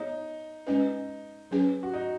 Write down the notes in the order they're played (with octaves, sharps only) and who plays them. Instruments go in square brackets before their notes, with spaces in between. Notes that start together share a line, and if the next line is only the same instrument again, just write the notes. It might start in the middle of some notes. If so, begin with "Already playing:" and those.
Already playing: [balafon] B3 G#4 C#5 [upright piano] D#4
[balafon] G#3 C#4 B4 [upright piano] D#4
[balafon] F#3 C#4 G#4 B4
[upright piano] F#4
D#4